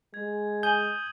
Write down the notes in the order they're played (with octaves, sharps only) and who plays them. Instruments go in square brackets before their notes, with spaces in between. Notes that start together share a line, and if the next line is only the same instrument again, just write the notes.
[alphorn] G#3 [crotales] G#6
[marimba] G#5 [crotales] D#6 D#7 F#7 [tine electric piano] G6